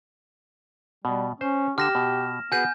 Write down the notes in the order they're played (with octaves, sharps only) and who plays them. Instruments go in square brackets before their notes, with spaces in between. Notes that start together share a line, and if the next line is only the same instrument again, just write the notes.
[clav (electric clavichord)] B2 [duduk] G3
[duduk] C#4 [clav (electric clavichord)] C5
[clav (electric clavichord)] D3 [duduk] G4 [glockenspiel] F6 A#6 E7
[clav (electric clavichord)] B2
[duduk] B3 [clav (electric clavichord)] F#4 G#4 B4 [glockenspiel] G#5 G6